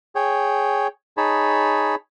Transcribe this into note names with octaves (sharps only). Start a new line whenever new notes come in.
G#4 C#5 G5
D#4 G#4 C#5 A5 B5